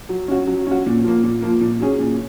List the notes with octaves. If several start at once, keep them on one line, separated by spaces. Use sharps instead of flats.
F#3
C#4 F#4
F#3
C#4 F#4
A#2
F3 A#3
A#2
F3 A#3
A#2
F#3 C#4 G#4
A#2